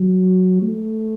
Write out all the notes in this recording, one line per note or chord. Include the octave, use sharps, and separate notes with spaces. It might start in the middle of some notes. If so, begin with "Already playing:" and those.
Already playing: F#3
A3